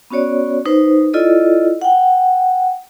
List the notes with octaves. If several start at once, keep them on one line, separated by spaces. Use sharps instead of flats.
B3 C#4 F#4 C#5 D5
D#4 B4 C5
E4 F4 A4 D5 D#5
F#5 G5